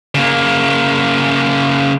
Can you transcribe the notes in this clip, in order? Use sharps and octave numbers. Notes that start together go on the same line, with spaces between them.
C#3 A#3